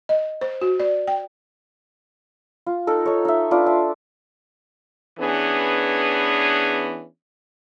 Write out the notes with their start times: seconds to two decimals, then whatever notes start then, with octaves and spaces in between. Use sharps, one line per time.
0.09 D#5
0.41 C5
0.62 F#4
0.80 D5
1.08 G5
2.66 F4
2.87 D#4 A4 A#4
3.06 D#4 A4 C#5
3.25 D#4 E5
3.51 D4 F4 B4 D5
3.66 E5 A5 C6
5.19 E3 B3 C#4 D4 G#4